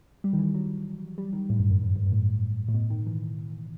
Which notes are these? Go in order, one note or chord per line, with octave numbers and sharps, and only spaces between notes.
G3
D#3
E3
F#3
G3
D#3
A2
G2
F#2
F#2
G2
G2
A2
A2
B2
D#3
E3